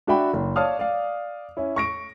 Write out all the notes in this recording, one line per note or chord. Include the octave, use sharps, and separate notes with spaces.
D4 F#4 D5 E5 G5 B5
F#1
C#5 D5 F5 A5 D#6 F6
D5 F5
C#4 E4
C#6 A#6 D7